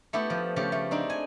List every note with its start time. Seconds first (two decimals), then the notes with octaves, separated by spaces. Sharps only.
0.13 A3 B3 E4 G4
0.30 F3
0.56 C#3 F3 A3 G4
0.72 A3
0.91 C4 D4 D#4
1.10 G#5